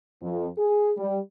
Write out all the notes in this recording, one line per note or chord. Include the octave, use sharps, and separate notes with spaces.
F2
G#4
G3